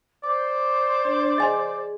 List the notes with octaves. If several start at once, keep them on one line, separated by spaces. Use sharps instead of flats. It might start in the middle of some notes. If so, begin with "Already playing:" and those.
C5 D5 D6
D4
G#4 D#5 G#5 C6